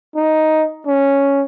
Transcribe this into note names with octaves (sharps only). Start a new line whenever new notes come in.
D#4
C#4